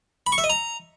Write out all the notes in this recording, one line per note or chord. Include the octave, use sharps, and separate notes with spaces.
B5
C#6
E5
D#5
A#5